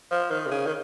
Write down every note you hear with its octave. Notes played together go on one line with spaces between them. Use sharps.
F3
D#3
C3
C#3
D#3